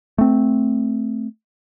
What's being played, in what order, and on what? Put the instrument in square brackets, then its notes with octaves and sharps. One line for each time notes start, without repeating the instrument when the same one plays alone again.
[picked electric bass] A3 C4